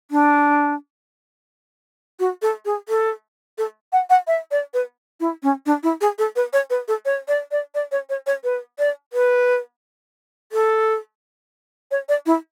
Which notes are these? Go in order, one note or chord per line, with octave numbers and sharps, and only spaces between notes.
D4
F#4
A4
G#4
A4
A4
F#5
F#5
E5
D5
B4
E4
C#4
D4
E4
G#4
A4
B4
C#5
B4
A4
C#5
D5
D5
D5
C#5
C#5
C#5
B4
D5
B4
A4
C#5
D5
E4